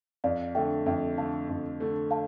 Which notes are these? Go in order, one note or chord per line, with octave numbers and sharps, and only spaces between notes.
F2 D5 F5
D3 A3 E5 G5
F2 E5 G5
D3 A3 F5 A5
F2
D3 A3
F5 A5